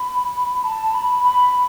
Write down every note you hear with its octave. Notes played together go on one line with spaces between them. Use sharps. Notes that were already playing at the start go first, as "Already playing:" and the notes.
Already playing: B5
A5
B5
B5